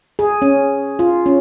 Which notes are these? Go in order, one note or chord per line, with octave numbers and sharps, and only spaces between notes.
G#4
C#4
F4
C#4